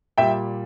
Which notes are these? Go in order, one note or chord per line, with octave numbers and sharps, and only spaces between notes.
A#2 G3 E5 G5